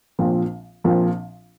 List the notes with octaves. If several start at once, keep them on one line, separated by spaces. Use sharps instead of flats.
A#1 A#2 F3 C4
A#1 A#2 F3 C4